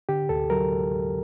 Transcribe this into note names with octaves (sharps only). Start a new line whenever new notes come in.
D3 G4
D2 A4
F#3 A#4